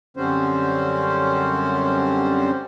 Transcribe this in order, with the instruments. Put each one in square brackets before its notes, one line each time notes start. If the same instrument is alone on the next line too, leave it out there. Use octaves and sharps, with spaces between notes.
[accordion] F#2 D3 G3 C4 C#4 C5